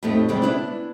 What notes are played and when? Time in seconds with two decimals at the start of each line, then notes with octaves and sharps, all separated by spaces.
0.03 F2 A2 A3 D#4 G4
0.29 E2 C3 G3 G#3 C4
0.42 B3 D4 E4